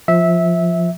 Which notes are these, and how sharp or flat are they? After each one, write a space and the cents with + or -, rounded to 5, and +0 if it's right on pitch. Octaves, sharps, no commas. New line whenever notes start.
F3 +0 E5 -15